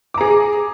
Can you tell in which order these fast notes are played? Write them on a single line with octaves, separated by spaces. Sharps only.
D6 A#5 G#4